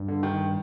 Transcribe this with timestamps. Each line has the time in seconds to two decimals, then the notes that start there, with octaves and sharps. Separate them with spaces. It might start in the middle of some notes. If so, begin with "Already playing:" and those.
Already playing: G2
0.08 D3
0.23 D#3